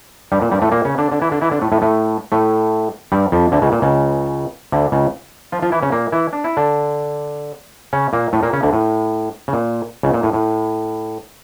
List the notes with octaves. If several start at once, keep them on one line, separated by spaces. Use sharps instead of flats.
G2 G3
A#2
G2 G3
A2 A3
A#2 A#3
C#3 C#4
D3 D4
D3 D4
E3 E4
D3 D4
E3 E4
D3 D4
A2 A3
A2 A3
A2 A3
A2 A3
G2 G3
F2 F3
D2 D3
C#2 C#3
A#2
C#2 C#3
D2 D3
C#2 C#3
F3 F4
F3 F4
E3 E4
C#3 C#4
A#2 A#3
E3 E4
D4
E4
D3 D4
C#3 C#4
A#2 A#3
A2 A3
A#2 A#3
C#3 C#4
D2 D3
A2
C#3
A#2
C#2 C#3
A#2
A2
A2